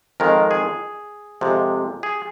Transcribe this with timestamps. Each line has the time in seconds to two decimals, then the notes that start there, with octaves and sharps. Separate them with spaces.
0.20 F2 D#3 G#3 A#4
0.51 G#4
1.41 F2 C3 G#3
2.03 G#4